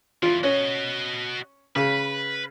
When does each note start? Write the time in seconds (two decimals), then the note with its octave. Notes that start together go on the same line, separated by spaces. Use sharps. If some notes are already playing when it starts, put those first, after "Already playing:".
0.23 E2 E3 F4
0.43 C#4 F#4 D#5
1.76 C#3 B4